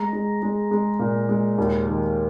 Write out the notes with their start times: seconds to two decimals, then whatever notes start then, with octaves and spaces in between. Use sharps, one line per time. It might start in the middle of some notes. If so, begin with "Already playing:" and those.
Already playing: G#3 A#5
0.13 G#3
0.43 G#3
0.71 G#3
0.99 A#2
1.29 G#3
1.58 D#2
1.86 D#3